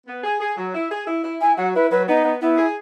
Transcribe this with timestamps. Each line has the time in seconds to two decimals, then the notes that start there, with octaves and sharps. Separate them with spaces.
0.07 B3
0.24 G#4
0.41 G#4
0.57 F#3
0.75 E4
0.91 G#4
1.07 E4
1.24 E4
1.41 E4 G#5
1.57 F#3 F#5
1.75 E4 B4
1.91 F#3 B4
2.07 B3 D#4
2.25 B3
2.41 B3 E4
2.58 G#4